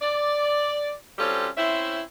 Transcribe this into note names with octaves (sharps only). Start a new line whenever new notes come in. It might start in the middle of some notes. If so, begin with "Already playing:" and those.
D5
G3 C4 C#4 F4 F#4 A4
C4 C#4 E4 C5 E5